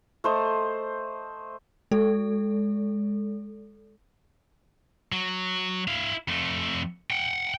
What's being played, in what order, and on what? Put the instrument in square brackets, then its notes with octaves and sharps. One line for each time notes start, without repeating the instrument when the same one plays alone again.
[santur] A3 C5 D#5
[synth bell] G#3 A4
[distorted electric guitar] F#3
E4 F5
F2 A3
F#5 G5